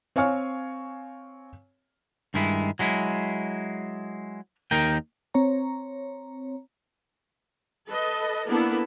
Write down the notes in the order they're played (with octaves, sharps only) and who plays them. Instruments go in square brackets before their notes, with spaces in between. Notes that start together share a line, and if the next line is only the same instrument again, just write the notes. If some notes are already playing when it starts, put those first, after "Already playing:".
[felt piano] C4 C#5 F5 G#5 C#6 F6
[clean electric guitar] G2 D#3 G#3 E4
F#3 G#3 E4
D#2 D#4 A#4 G5
[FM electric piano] C4 C#5 A#5
[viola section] A4 B4 D#5
A#3 B3 D4 E4 A4